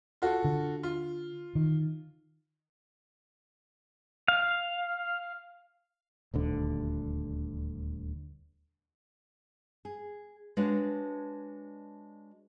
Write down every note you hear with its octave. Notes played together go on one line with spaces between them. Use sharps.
F4 F#4 A4
D3
F4
D#3
F5
D#1 D2 D3
G#4
G#3 D4 F#4 B4 C#5 F5